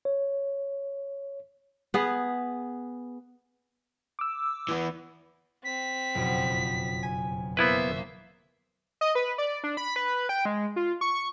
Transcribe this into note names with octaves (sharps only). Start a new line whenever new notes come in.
C#5
B3 G#4 B4
D6 E6
E3 B3
C4 B6
F#1 F2 B2
G#5
A#3 B3 E4 B4 C5 E5
D#5
B4
D5
D4
B5
B4
G5
G#3
F4
C#6